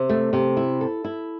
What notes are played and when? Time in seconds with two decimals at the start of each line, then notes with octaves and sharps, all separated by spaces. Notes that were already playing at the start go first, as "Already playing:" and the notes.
Already playing: C3
0.09 A3
0.33 C3
0.57 E4
0.81 A4
1.04 E4